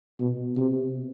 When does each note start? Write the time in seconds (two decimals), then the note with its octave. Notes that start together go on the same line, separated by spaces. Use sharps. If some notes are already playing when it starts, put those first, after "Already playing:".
0.20 B2
0.57 C3